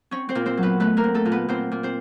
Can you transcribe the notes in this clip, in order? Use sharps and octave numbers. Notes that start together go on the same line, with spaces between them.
C4 C#4 C#5
C4 C5
A#2
C4 C5
F#3
B3 B4
A3 B3 B4
A#3 A#4
C4
A3 A4
A#2
B3 B4
A#2 C4 C5
A#2
C4 C5